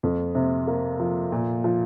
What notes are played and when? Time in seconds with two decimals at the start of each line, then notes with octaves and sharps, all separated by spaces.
0.03 F2
0.35 C3
0.67 A#3
1.00 F3
1.32 A#2
1.64 F3